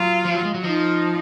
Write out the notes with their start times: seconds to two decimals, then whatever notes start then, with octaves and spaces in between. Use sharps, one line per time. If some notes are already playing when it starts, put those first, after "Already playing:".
Already playing: F#3 F4
0.25 F3
0.35 F#3
0.45 G#3
0.54 F#3
0.63 F3 D#4